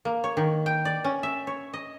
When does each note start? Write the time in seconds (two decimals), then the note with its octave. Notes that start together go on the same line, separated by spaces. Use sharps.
0.05 A#3
0.24 C#5
0.37 D#3
0.66 G5
0.85 D5
1.04 C#4
1.23 E5
1.47 C#5
1.74 D#5